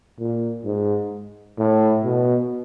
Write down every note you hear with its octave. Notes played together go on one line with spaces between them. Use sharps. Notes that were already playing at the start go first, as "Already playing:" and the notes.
A#2
G#2
A2
B2